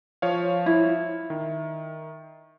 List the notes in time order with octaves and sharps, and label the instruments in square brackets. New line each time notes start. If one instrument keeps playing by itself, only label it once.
[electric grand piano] F3 C#5 F5
[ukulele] E4
[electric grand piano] D#3